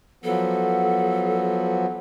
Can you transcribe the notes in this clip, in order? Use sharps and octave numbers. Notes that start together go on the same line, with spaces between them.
F3 F#3 B3 A4